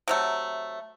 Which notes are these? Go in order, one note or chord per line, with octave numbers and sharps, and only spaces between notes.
C3 F#3 A3